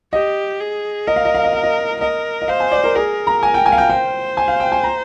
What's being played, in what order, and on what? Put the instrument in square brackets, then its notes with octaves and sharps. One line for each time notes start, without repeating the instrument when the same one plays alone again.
[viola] G4 [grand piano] D#5
[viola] G#4
[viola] A#4 [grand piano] D#5
[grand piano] F5
D#5
F5
D#5
F5
D#5
[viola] A#4 [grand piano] D#5
[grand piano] D#5
[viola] C5 [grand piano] F5
[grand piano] G#5
D5
A#4
[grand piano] G#4 [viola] A#4
[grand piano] A#5
G#5
G5
G#5
F5
G5
[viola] C5 [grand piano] G5
[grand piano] G#5
F5
G5
G#5
A#5